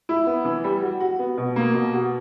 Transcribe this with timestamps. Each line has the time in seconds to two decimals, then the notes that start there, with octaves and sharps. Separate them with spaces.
0.09 E4
0.27 B3
0.45 E3
0.64 G3
0.82 F#4
1.00 F#4
1.19 B3
1.38 B2
1.56 A#3
1.74 B2
1.93 F#4